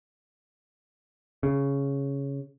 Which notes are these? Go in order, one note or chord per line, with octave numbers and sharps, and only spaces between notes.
C#3